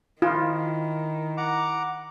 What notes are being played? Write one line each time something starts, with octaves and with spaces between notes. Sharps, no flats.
D#3 E4 F4
F#5 A#5 D6